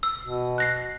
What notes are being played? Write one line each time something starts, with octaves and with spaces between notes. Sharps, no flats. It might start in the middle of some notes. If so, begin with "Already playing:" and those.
E6
B2
F#6 A#6 C7